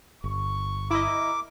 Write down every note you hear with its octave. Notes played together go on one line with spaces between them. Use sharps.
G1 C#6
E4 A#4 D#5 E5 A#5 D6